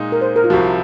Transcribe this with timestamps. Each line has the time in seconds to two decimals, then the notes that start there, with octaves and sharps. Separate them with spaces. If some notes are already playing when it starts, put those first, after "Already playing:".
Already playing: A#2 G#3 D#4
0.12 A#4
0.21 C5
0.36 A#4
0.44 F4
0.50 C2 C3 F3 F#4